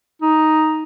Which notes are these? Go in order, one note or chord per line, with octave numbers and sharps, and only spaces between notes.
D#4